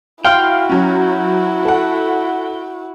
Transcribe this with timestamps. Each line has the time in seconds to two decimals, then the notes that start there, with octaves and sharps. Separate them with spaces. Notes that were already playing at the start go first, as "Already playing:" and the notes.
0.25 E4 F#4 F5 G5 C6 F6
0.69 F#3 C#4
1.65 A4 F#5